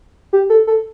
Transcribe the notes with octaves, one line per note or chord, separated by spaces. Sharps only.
G4
A4
A4